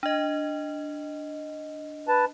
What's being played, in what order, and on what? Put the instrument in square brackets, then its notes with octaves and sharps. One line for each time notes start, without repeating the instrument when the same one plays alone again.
[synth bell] D4 D#5
[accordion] B4 A5